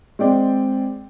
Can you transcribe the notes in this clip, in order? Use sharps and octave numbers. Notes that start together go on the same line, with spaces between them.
G#3 C4 D5 G5